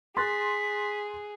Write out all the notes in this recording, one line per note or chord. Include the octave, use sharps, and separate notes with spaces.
G#4 C6 F#6 A6 B6